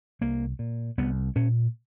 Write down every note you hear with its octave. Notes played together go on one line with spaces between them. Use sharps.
C2 A#3
A#2
C2 B3
A#2 C#4